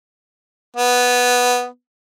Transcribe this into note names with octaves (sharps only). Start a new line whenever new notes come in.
B3